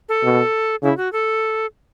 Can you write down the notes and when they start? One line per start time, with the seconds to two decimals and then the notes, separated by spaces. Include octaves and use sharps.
0.09 A4
0.23 B2
0.82 C#3 E4
0.97 F#4
1.13 A4